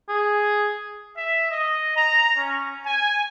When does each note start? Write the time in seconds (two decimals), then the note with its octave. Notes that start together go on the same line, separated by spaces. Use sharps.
0.09 G#4
1.17 E5
1.50 D#5
1.95 A#5
2.37 C#4
2.85 G#5